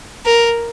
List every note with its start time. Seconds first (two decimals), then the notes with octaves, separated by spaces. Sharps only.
0.26 A#4